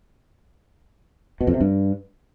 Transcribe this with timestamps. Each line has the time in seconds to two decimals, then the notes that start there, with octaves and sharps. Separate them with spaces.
1.41 B2
1.47 F2
1.54 C3
1.61 G2